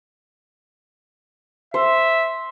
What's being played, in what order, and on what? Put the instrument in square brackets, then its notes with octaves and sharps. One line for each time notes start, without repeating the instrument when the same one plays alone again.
[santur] C5 [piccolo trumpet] E5